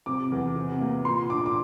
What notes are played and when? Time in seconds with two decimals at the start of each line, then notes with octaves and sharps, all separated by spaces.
0.06 C3 D6
0.32 E2
0.56 C3
0.81 A#3
1.05 A#2 C6
1.30 D4 D6
1.46 D6